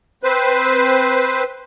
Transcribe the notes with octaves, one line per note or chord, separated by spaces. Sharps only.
C4 B4 C5